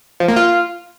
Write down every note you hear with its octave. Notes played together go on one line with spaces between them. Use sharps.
F3
A#3
F4